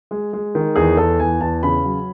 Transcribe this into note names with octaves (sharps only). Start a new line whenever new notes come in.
G#3
G#3
D#3
E2 G#4
E2 A4
E2 G#5
E2 A5
C#3 B5
F#3